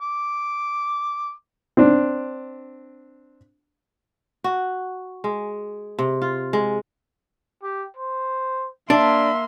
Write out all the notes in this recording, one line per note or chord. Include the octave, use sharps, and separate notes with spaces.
D6
C4 D4
F#4
G#3
C3
F4
G#3
G4
C5
A#3 D4 E5 C6